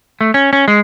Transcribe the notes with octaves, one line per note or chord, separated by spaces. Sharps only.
A3
C#4
C#4
G#3